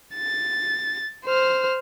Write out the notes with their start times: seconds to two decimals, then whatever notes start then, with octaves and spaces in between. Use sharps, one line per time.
0.15 A6
1.26 C5 F6